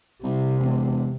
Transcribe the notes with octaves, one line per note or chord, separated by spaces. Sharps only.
C2 C3
E1